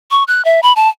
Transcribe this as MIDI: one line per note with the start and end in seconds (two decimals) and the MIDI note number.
0.11 0.24 85
0.28 0.44 90
0.45 0.60 76
0.63 0.73 83
0.76 0.89 81